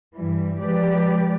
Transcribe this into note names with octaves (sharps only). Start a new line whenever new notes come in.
G2 E3 G3
F3 G#3 G4 B4 D5